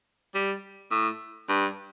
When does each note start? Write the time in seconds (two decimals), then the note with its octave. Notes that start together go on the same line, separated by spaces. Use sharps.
0.35 G3
0.91 A2
1.49 G2